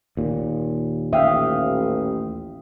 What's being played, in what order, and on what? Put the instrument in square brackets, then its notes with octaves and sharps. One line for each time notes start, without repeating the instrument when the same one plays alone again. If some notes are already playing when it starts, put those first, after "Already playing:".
[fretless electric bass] D#2 A#2
[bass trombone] A1 [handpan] E5 [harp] F5 G5 D#6